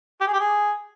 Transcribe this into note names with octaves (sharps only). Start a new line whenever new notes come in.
G4
G#4
G4
G#4